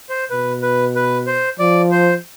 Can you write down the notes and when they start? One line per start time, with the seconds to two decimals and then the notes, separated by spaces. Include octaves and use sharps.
0.09 C5
0.30 B2 B4
0.62 B4
0.96 B4
1.27 C5
1.59 F3 D5
1.91 C5